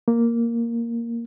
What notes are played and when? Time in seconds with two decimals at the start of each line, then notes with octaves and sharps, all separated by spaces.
0.08 A#3